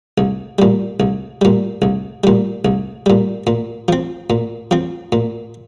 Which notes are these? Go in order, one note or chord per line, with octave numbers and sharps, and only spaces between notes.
C2
A#2 G3
C2
A#2 G3
C2
A#2 G3
C2
A#2 G3
A#2
F3 C4
A#2
F3 C4
A#2